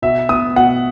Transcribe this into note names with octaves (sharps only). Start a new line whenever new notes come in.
B2 E5
B3 D#6
B2 F#5